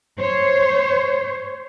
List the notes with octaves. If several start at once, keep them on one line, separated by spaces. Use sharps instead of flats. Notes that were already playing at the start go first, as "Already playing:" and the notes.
C5 C#5